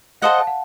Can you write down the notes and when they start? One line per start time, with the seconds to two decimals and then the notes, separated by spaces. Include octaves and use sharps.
0.22 A4 C5 D#5 F5 F#5
0.38 A5
0.47 F#5